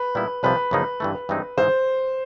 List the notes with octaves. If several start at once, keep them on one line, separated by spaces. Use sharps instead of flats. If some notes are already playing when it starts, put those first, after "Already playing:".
Already playing: B4
A#2 G3 B3 E4
C2 C3 F3 B4
F#2 C#3 F3 A#3 D#4
G2 E3 A3
G2 E3 G#3 C4 D#4
G#2 E3 G#3 C#4 C5